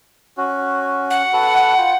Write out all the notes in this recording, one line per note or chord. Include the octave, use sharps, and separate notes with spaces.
C#4 F#4
F#5
F#4 A4 B4
F4 G5